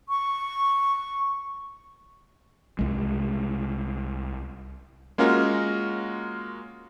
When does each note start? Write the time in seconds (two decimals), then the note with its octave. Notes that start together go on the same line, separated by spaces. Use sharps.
0.09 C#6
2.79 C2 G#3
5.18 G#3 A#3 C#4 F4 F#4 A#4